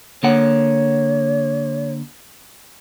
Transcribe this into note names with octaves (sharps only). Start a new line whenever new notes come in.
D3 A#3 C#5 F#5